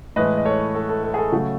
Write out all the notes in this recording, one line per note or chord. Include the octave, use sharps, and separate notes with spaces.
A2 E3 G#3 B4 D#5
D#5
A4 C#5
A4
A4
A4
G#4
A4
C#3 F#3 A3